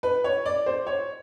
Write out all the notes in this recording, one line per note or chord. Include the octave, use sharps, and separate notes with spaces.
B4
C#5
D5
C5
C#5